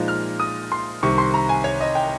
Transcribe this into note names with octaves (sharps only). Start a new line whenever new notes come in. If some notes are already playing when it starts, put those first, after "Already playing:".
Already playing: A#2 F3 G#3 D#4
F6
D#6
C6
C2 C3 D#3 C#6
C6
A#5
G#5
C#5
D#5
G5